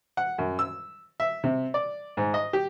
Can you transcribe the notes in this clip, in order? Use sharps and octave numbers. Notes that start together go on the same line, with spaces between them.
F#5
F#2
E6
E5
C3
D5
G#2
D#5
G4